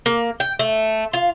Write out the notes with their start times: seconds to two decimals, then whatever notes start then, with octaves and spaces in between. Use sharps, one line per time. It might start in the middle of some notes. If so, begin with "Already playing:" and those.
0.06 A#3
0.40 G5
0.59 A3
1.13 F4